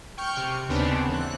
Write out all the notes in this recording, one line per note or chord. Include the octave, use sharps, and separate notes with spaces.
G5 C#6 F6 G6
C3
D#2 C#3 B3 C4 D4
E3 F#6